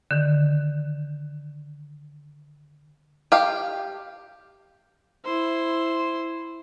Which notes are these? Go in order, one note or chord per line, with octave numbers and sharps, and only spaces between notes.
D3 D#3
G4 F5
E4 C5